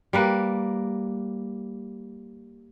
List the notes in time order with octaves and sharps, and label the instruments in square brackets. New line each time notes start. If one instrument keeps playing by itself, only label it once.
[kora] G3 A#3 B4